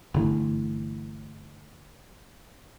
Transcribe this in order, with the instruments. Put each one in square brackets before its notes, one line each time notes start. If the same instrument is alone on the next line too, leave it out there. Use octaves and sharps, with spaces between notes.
[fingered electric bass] G1 D3 E3 A3